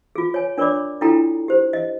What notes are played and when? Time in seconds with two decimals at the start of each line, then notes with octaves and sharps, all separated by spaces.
0.16 F4 G#4
0.34 C#5 G#5
0.58 D4 A#4 C#5 D5 B5 D6
1.01 D4 E4 F4 A4 G5 A#5
1.48 G4 C5
1.73 D#5